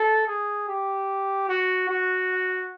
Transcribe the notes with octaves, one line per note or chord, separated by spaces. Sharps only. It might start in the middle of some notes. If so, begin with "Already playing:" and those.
Already playing: A4
G#4
G4
F#4
F#4